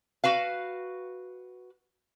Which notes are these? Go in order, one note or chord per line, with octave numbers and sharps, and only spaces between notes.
F#4 B4 F5